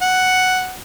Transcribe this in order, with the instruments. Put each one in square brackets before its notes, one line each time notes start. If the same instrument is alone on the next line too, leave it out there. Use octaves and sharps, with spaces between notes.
[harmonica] F#5